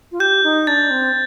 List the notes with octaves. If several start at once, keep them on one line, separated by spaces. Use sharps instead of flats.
F4
G4 G6
D#4
D4 A6
C4